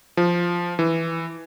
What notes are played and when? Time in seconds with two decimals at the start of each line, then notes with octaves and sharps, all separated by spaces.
0.17 F3
0.79 E3